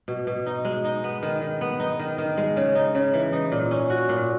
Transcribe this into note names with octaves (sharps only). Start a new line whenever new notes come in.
B2
B2
D#4
G#3
D#4
B3
D#3
D#3
B3
D#4
D#3
D#3
G#3
C#3
D#4
C#3
E3
D#4
A#2
C#4
F#4
A#2